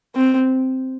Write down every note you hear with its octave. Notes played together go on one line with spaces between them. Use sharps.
C4